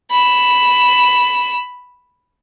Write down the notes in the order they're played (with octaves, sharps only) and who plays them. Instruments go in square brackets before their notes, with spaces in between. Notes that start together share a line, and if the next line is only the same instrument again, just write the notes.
[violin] B5 E7